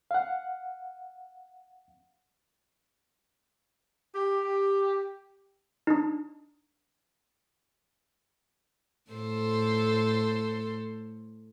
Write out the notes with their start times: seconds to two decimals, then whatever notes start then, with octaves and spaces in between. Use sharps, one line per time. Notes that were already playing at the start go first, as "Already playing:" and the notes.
0.11 F5 F#5
4.14 G4
5.87 D4 D#4
9.11 A2 A4 C5